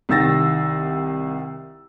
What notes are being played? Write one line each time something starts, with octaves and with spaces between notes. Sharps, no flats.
C2 D#3 E6 A6 A#6